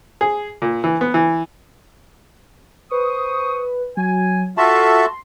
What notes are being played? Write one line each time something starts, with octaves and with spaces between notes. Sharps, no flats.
G#4
A#2
E3
B3
E3
B4 C5 C#6 D#6
F#3 G#5
F4 F#4 A4 E5 A5 C6